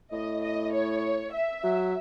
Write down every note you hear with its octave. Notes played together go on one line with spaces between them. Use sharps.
A2 D#5
D#5
C#5
E5
F#3